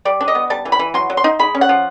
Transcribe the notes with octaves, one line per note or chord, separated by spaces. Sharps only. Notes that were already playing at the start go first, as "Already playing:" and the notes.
G3 D5
D4
D#5
B3
G3 A5
E3
B5
E3
F#3 C6
F#3
C6
D#4
G#3 B5
C#4
F#5
F3